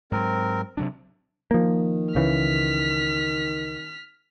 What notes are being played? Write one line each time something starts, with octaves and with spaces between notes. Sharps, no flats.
G#2 F#3 C4 A#4
C3 F#3 D4
D#3 F3 A#3
C#2 C#3 E3 F6 B6